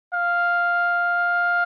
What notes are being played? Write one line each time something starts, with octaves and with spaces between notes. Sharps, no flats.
F5